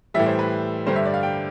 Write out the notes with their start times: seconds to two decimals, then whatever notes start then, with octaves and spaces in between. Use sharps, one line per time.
0.14 A2 E3 G3 E5
0.26 C5
0.39 B4
0.86 G2 D3 G3 C5
0.96 E5
1.05 D5
1.14 F5
1.23 G5